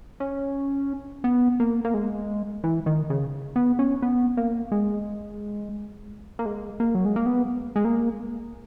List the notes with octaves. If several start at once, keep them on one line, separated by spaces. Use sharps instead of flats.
C#4
B3
A#3
A#3
G#3
E3
D#3
C#3
B3
C#4
B3
A#3
G#3
A#3
G#3
A#3
F#3
G#3
A#3
B3
G#3
A#3